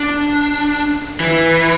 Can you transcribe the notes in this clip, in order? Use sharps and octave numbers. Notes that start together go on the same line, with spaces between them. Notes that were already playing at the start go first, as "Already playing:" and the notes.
Already playing: D4
E3